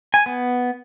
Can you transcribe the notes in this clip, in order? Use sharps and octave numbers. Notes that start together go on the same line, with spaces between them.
G#5
B3